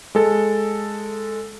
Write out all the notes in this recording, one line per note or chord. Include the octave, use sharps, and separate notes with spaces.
G#3 A4 A6